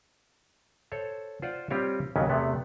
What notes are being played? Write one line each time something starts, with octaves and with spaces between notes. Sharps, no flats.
A4 C5 C#5
F4 C5 D5 F#5
G3 C4 F4 G4 C#5
D#2 C#3 F#3 B3 C#4
E2 C3 A3 B3